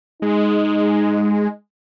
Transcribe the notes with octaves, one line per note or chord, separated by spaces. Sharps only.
G#3 D#4